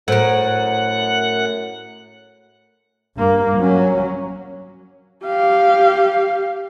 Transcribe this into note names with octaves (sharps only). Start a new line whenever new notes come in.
F#2 A2 A4 A#4 C5 F#5
G2 A#3
F#3 C#4
G4 F5